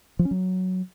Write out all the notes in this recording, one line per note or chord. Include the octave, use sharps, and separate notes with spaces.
F3
C#4
F#3